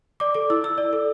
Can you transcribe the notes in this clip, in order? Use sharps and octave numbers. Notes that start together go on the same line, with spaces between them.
D5 D6
A4 D6
E4 E6
E4 E6
D5
A4